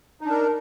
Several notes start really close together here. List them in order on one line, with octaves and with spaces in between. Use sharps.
D#4 D4 A#4